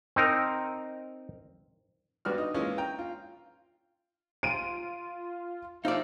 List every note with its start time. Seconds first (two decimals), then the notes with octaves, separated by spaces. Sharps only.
0.16 C4 D#4 A#4
2.25 G2 G3 B3 F#4 D5 F6
2.38 D#4
2.54 E3 G#3 A#3 C#4 F4
2.78 G5 A#5
2.99 F4
4.43 F4 D7 D#7
5.85 F3 D#4 D5 E5 F5